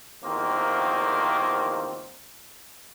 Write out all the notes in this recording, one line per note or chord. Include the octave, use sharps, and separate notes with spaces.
E2 G2 D#3 F3 A#3 C4